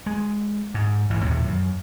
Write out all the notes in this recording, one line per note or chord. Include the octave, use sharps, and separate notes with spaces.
G#3
G#2
A1 G#2 E3
A#1 D#2 A2
F#2